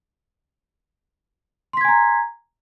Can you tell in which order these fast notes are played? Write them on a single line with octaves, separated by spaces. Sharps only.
C6 B6 G#6 G#5 A#5